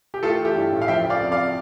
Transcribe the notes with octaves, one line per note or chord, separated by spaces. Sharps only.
G4
A3 F4 A4
E3
E4 G4
G2
A1
F5
F3 E5 G5
C#3
D5 F5
F2
D5 F5